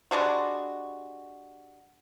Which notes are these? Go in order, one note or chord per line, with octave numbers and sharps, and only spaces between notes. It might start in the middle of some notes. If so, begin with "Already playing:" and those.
G3 G#3 D4 F#4